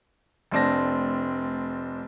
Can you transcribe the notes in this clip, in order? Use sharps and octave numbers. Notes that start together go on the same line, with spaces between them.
F1 A3 C4 D4 A#6